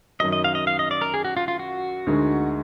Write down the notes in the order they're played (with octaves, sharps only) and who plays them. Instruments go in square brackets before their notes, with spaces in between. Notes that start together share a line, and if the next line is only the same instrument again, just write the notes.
[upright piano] F#2 D#3 F#3 [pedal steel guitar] D#5
[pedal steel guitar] D#5
F5
D#5
F5
D#5
D5
A#4
G#4
F#4
F4
F4
F#4
[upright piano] D2 D3 G#3 D#4 A#4